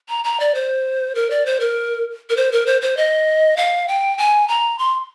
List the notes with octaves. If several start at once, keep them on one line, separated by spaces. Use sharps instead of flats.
A#5
A#5
D5
C5
A#4
D5
C5
A#4
A#4
C5
A#4
C5
C5
D#5
F5
G5
G#5
A#5
C6